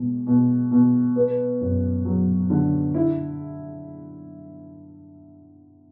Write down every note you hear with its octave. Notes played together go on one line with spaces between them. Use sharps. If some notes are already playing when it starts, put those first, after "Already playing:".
Already playing: B2 G#3
B2
B2
B3
F#2
F#3
D3
E4